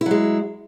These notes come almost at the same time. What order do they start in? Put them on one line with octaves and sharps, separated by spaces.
E4 F#3 G#3